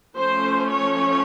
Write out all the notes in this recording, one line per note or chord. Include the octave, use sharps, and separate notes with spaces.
F3 A3 C#4 C5
C#5